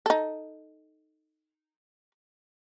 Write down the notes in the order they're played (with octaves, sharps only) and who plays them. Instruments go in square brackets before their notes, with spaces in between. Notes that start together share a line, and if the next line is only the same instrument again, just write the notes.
[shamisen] D#4 A4